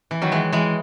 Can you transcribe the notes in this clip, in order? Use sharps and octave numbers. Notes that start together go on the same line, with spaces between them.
E3
D#3 F#3
E3 G#3
E3 G#3